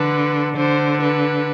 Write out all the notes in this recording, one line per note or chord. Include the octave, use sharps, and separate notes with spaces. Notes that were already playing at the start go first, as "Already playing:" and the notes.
Already playing: D3 B4
D3 C5
B4